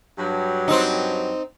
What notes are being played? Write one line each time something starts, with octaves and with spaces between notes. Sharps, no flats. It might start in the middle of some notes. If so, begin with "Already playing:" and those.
G2 F#3
C4 D#4